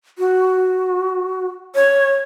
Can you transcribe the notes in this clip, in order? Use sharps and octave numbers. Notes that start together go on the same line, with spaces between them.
F#4
C#5